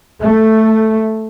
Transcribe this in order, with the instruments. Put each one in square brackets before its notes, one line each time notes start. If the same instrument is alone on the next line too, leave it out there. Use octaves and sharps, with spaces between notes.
[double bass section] A3